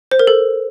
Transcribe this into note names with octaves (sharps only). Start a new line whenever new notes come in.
C5
A#4
A4